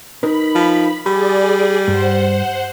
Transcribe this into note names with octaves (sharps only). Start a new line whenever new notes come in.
D#4 A#4 B4 B5
F3
G3 G#4 D5 B5
G2 C5 F#5